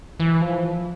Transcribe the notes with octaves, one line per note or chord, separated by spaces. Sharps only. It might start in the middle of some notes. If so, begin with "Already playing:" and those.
E3
F3